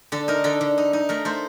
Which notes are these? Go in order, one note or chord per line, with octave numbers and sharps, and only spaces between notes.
D3 A4
D#4 A#4
D3 A4
D3
D#4
D#4
A3 A#4
A3 C5